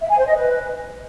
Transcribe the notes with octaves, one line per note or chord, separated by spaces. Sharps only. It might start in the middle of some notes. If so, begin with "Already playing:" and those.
E5
G#5
C5
D#5
B4